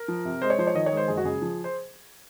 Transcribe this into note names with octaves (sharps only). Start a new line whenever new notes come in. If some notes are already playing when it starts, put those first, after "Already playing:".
Already playing: A#4
F3
C3
G#3 C5
C#5
F3 C5
C#5
D#3 D#5
C#5
G#3 C5
F#1 G#4
F#4
C#3 G#4
F3
C5